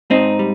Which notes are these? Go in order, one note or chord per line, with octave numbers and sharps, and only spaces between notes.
G#2 C4 D#4
G3